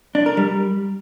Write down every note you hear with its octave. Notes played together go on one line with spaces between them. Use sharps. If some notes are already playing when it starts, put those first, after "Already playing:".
D4
A#4
G3